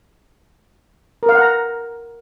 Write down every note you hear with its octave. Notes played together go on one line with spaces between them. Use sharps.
A#4
F5
F#5
A#5